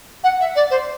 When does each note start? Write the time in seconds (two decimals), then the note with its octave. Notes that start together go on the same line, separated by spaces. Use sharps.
0.23 F#5
0.40 E5
0.55 D5
0.70 C5